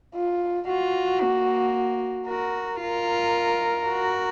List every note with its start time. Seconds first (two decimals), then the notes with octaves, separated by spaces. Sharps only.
0.15 F4
0.68 F4 F#4
1.22 A#3
2.28 F#4 A#4
2.82 F4 A#4
3.88 F#4